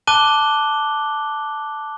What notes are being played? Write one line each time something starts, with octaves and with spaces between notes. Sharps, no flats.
A5 D6 F#6 D#7 G7